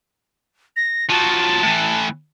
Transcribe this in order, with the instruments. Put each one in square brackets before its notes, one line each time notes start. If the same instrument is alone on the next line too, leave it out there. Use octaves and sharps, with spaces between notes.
[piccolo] A#6
[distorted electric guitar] F3 F#3 [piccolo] A5
[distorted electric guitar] A2 E3